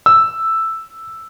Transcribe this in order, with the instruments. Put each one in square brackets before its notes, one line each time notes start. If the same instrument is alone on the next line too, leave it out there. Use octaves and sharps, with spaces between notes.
[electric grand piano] E6